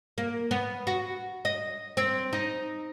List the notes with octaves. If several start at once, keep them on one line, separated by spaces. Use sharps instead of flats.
A#3
B3
F#4
D#5
C4
D#4